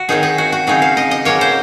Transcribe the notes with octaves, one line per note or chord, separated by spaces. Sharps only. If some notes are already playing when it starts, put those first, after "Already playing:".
Already playing: F#4
D#3 F#3 C4 D#4 G#4
G#4
F#4
F#4
C#3 F#3 C4 D#4 G#4
F5
D#5
D#5
C#3 F#3 A#3 C#5
C5